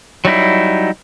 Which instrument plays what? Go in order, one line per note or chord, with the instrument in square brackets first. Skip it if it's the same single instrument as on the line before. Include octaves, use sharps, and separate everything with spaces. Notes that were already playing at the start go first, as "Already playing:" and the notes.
[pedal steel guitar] F#3 G3 D#4 E4